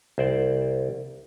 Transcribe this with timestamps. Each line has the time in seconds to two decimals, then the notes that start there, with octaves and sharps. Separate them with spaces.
0.18 C2 C5 D5